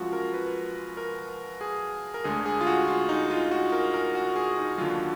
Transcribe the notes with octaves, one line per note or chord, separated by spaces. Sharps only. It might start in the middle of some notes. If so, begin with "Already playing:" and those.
Already playing: F#2 F3 G#3 F4 F#4
A#4
B4
A#4
G#4
A#4
D2 D3 G#3 G#4
G#4
F4
F#4
F4
D#4
F4
F#4
A#4
A#4
F#4
G#4
D#4
D#2 D3 F#3 F4